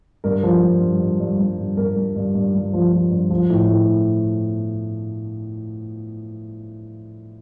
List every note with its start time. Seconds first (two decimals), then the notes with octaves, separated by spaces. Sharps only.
0.24 G2 A#4
0.43 F3
0.62 G2
0.81 G2
1.01 G2
1.20 G2
1.39 G2
1.59 G2
1.77 G2 A#4
1.96 G2
2.16 G2
2.35 G2
2.54 G2
2.73 F3
2.92 F3
3.11 G2
3.30 F3
3.50 A2
3.69 A2